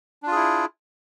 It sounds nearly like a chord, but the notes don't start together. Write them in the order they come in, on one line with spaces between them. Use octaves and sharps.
D4 F4 G#4 E4